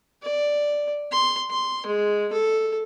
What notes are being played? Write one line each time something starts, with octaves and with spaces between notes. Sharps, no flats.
D5
C6
C6
G#3
A4